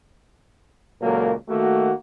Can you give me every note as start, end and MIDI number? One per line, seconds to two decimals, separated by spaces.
1.01 1.32 37
1.01 1.32 46
1.01 1.32 54
1.01 1.32 58
1.01 1.32 69
1.01 1.32 70
1.49 1.92 51
1.49 1.92 57
1.49 1.92 58
1.49 1.92 66